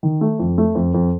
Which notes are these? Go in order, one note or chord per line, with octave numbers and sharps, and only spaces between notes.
D#3
A3
F2
A3
F2
F2